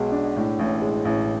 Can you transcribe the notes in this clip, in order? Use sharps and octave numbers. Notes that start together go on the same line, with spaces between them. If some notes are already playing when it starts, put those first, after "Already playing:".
Already playing: B1 B2 G#3
D4
A2
A1
G#3
A1